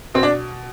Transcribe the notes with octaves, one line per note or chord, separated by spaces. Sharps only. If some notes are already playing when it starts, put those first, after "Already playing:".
B2 C4
D4